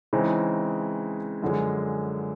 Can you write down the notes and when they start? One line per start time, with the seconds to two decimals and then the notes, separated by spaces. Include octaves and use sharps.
0.13 C#3 E3 G#3 C4 D#4
1.43 F#2 D3 F3 G#3